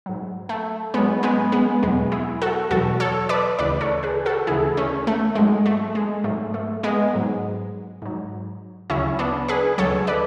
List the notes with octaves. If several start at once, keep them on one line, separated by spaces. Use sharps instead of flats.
G#2 F#3
A3
G#2 F#3 G#3 B3
G#3 B3
G#3 B3
E2 B2 F#3 G#3 B3
E4 G#4
F#4 A4
E2 B2 F#3 F#4 A4
A4 C#5
B4 D5
D2 C#3 E3 B4 D5
A4 C#5
G#4 B4
F#4 A4
D2 C#3 E3 E4 G#4
A3 C#4
A3
G#2 F#3 G#3
A3
G#3
G#2 F#3 A3
A3
G#3 B3
G#2 F#3
G#2 F#3
D2 C#3 F#3 C#4 E4
B3 D4
G#4 B4
D2 C#3 F#3 A4 C#5
B4 D5